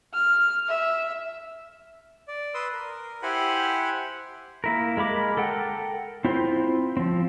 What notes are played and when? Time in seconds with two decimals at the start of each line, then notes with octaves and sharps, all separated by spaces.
0.14 F6
0.68 E5
2.28 D5
2.54 B4 C6 D#6 E6
2.73 A#4
3.23 E4 G4 C5 F#5 G#5 B5
4.64 A#3 E4 A#4
4.97 G#3 A#4 B5 D6
5.37 A4 A#4 F#5 G5
6.25 C4 E4 F4 C5
6.97 F3 C4